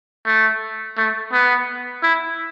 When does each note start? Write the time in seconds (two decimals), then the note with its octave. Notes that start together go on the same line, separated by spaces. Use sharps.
0.26 A3
0.97 A3
1.33 B3
2.03 E4